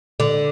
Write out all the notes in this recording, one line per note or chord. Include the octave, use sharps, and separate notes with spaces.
D3